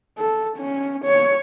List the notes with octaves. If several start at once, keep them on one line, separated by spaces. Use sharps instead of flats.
A4
C#4
C#5